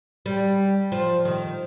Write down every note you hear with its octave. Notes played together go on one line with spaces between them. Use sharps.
G3
F3
D#3